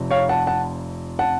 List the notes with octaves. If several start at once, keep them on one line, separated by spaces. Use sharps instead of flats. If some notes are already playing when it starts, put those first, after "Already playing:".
Already playing: F1 F2 F3
C#5 F5
F#5 A5
F#5 A5
F#5 A5